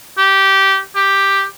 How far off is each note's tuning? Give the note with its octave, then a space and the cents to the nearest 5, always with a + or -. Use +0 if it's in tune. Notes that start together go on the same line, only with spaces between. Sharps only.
G4 -15
G4 +5